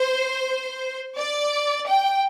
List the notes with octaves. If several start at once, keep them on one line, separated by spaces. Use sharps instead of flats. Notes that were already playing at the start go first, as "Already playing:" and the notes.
Already playing: C5
D5
G5